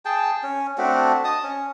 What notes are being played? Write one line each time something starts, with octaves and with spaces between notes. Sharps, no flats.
G#4 G5 A5
C#4
A3 C4 D4 F#4
D#5 A5 D#6
C#4